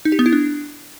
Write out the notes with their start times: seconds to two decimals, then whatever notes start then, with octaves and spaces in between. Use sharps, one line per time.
0.05 D#4
0.12 G4
0.19 B3
0.26 E4
0.33 D4